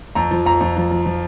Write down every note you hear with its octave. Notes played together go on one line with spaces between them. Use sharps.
F2 A#5
F3
F2 A#5
F2
F3
F3
F3